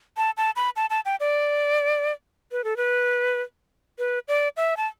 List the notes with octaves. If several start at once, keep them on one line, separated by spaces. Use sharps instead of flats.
A5
A5
B5
A5
A5
G5
D5
B4
A4
B4
B4
D5
E5
A5